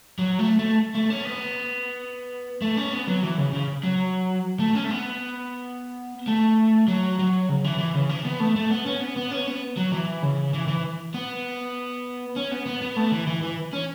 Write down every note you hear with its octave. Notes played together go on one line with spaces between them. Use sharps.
F#3
A3
A3
A3
C#4
B3
A3
C#4
B3
F#3
E3
C#3
C#3
F#3
A3
C#4
A3
B3
A3
F#3
F#3
C#3
E3
E3
C#3
E3
B3
A3
A3
B3
C#4
B3
B3
C#4
B3
F#3
E3
C#3
E3
E3
B3
C#4
B3
B3
B3
A3
E3
E3
E3
C#4